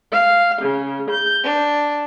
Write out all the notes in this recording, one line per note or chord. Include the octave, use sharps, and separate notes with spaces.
F5
C#3
G6
D4